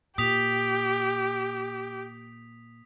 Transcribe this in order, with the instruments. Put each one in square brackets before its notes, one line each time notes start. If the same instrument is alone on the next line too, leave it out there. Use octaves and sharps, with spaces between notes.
[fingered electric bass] A#2 [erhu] G4 [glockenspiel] D#6 B6 F7